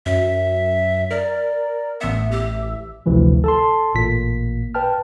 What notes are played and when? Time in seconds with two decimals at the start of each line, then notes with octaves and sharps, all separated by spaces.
0.06 F#2 E5
1.11 A#4 D5
2.01 A1 B3 E5
2.31 G4
3.06 A1 D2 C3 E3 F3
3.44 A4 A5 C6
3.95 A1 A#2 A#3 B6
4.75 B4 G5 A5 F6